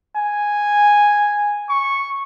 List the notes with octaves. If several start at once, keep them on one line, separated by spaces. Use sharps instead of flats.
G#5
C#6